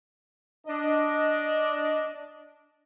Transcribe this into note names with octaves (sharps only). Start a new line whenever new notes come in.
D4 D#5